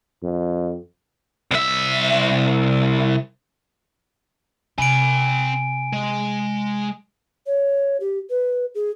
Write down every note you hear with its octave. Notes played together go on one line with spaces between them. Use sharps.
F2
C2 E5
C3 C4 G#5 B5 D7
G#3
C#5
G4
B4
G#4